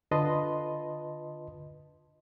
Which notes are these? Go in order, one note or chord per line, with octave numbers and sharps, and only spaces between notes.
D3 F4 B4 D#5 A5 C6